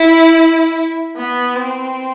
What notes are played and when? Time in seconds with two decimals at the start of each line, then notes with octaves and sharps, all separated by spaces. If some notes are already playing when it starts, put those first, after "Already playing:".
Already playing: E4
1.16 B3
1.55 C4